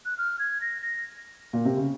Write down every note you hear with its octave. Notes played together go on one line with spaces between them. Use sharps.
F#6
F6
G#6
A#6
A#6
A#2
C3
C#3